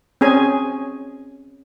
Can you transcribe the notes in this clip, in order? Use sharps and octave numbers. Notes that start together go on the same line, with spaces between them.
C4 C#4 G#4 G#5